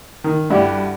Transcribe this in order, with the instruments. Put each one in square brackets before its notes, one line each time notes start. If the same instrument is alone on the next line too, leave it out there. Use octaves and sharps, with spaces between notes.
[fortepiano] D#3
[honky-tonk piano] G2 F#4 [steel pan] D4 [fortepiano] E4 G4